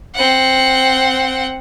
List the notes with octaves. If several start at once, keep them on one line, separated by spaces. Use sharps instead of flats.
C4 F#5